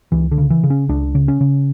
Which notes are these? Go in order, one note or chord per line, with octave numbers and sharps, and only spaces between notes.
C#2 E3
D3
C#3
E3
C#3
C#4
C#2 D4
C#3
C#4
C#3